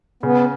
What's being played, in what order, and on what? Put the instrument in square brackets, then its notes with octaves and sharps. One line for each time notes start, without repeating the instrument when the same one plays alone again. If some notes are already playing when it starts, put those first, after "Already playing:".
[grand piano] C#3 [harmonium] B3